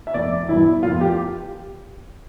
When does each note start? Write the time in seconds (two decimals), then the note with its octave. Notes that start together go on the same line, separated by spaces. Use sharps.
0.07 E5
0.14 F1 D5
0.48 E2 B2 G3 E4
0.83 F1 F4
1.01 G4